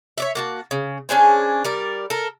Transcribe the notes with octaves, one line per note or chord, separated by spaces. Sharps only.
C#5 D5 E5
A#3 F#4 A5
C#3
C#4 D4 G#4 C5
G3 A#4 D5
A4 A#4